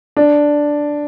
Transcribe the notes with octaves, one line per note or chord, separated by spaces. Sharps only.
D4